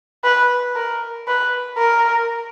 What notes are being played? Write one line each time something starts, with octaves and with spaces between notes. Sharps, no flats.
B4
A#4
B4
A#4